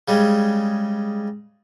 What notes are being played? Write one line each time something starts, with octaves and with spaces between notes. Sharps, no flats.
C#3 G3 G#3